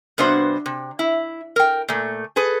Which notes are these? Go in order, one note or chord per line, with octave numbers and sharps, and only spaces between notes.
G2 C3 B3 D4 F#4 C5
C3
E4
A#4 G5
A#2 A3
G#4 A4 B4